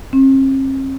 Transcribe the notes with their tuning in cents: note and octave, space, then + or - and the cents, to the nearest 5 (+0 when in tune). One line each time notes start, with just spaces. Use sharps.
C4 +45